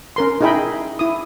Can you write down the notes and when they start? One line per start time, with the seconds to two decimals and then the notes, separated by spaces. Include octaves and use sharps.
0.16 C#4 A#4 C6
0.41 D#4 E4 G#4 D#5 G5 B5
0.99 E4 D#6